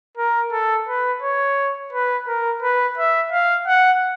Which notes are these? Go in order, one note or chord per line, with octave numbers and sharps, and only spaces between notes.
A#4
A4
B4
C#5
B4
A#4
B4
E5
F5
F#5